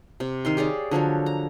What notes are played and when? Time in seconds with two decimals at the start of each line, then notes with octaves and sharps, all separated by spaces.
0.20 C3
0.45 D#3 F5 C6
0.57 G4 G#4 C#5 D5
0.91 D3 F3 F#3 C#5
1.26 A#5